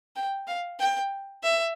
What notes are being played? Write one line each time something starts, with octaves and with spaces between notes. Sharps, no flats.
G5
F5
G5
E5